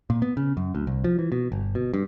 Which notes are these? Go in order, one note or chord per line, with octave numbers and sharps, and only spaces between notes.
A#2
B3
C#3
F#2
D2
C2
F3
E3
B2
G1
B2
G2